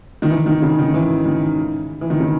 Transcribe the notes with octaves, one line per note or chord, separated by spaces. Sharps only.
D#3
E3
D#3
C#3
D#3
E3
D#3
E3
D#3
C#3